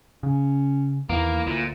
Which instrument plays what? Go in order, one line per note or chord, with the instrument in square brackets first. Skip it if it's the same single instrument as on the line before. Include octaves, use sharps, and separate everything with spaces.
[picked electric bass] C#3 [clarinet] C#4
[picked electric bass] E2 D#3 [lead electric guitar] A#3 [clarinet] E4
[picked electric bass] D2 [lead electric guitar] A#2